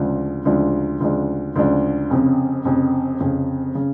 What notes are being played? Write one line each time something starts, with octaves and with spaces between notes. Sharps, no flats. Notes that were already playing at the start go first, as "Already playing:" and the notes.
Already playing: D2 C#3 F3 G#3 D4
D2 C#3 F3 G#3 D4
D2 C#3 F3 G#3 D4
D2 C#3 F3 G#3 D4
F1 F2 C#3
F1 F2 C#3
F1 F2 C#3
C#3